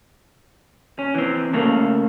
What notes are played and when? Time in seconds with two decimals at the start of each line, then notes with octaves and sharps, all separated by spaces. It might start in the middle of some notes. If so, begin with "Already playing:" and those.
0.99 C#4
1.15 E3 C4
1.53 C#3 A3 A#3